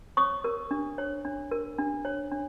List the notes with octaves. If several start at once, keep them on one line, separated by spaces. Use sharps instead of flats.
C#5 C#6 D#6
A#4
D4
C#5
D4
A#4
D4
C#5
D4